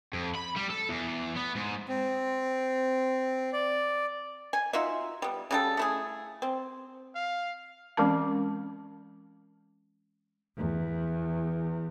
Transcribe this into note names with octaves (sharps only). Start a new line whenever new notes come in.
F2
B5
G3
A4
E2
B3
G#2
C4
D5
G#5
D#4 F4 F#4 E5
G3 B3
C#3 G3 A4
A3 E4 G#4
C4
F5
E3 G#3 C4 C#4 A#4 A5
E2